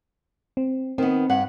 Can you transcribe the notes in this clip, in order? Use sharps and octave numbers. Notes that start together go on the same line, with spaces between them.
C4
D#3 B3 C4
G2 F#5